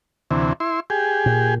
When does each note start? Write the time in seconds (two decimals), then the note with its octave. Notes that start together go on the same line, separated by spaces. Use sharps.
0.31 D2 C3 E3
0.60 E4 C6
0.90 G4 G#4
1.26 A#2